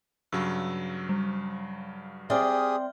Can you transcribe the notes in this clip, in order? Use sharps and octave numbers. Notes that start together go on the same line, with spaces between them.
G2 C#3 F#3 E6
G3
C4 G4 G#4 D5 E5 G5 D#6 F6